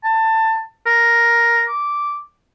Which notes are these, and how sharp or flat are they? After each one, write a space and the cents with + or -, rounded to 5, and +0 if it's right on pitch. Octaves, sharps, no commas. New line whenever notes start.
A5 +20
A#4 +5
D6 -5